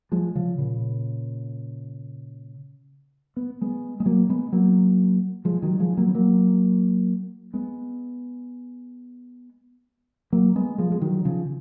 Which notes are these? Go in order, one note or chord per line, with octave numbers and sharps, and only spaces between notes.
F3 G#3
C#3 F3
A#2 C#3
B3
G#3 B3
G#3
F#3 A#3
G#3 B3
F#3 A#3
F3 G#3
D#3 F#3
F3 G#3
F#3 A#3
B3
F#3 A#3
G#3 B3
F#3 A#3
G#3 B3
F3 G#3
G#3
D#3 F#3
C#3 F3